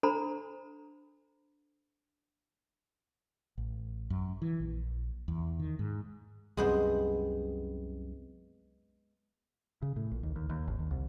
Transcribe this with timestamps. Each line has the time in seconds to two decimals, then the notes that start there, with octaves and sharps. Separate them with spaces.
0.03 D4 A4 C5 A#5 B5
3.58 A1
4.10 F#2
4.42 E3
4.60 A#1
5.28 E2
5.60 D#3
5.79 G#2
6.57 C2 F#2 C3 G#3 B3 C5
9.82 C#3
9.96 A2
10.11 A#1
10.23 D#2
10.36 D#2
10.49 D#2
10.68 G#1
10.79 D#2
10.91 C2